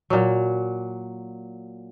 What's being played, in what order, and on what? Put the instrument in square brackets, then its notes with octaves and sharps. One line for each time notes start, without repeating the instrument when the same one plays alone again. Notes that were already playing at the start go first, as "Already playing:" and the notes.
[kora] A#2 F#3